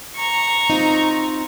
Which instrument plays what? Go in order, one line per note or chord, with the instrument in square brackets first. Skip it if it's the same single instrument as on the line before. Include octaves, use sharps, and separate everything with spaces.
[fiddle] A#5 C#6
[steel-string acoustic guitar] C4 D#4 F4